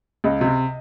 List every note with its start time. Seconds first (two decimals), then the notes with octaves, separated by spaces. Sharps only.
0.24 C#2 D#5
0.41 C3